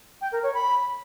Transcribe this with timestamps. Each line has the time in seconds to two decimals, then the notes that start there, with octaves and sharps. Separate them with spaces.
0.21 G5
0.32 A#4
0.43 C#5
0.54 B5